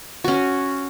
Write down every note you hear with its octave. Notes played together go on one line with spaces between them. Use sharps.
C#4 F#4